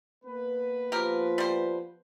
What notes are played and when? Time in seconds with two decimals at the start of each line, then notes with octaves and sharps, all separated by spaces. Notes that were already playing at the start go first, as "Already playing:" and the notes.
0.25 A#3 B3 B4
0.92 F3 G4 A#4
1.38 G3 C5